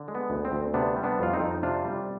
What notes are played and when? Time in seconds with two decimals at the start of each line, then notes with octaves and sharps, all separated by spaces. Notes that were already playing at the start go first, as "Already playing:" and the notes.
Already playing: D3
0.08 G#3
0.15 B3
0.30 D2
0.45 C4
0.52 D2
0.74 C3 B3 D4
0.96 G3
1.03 B3 D4
1.19 F2 F4
1.33 C4 D#4
1.40 F2
1.63 C3 D4 F4
1.85 G3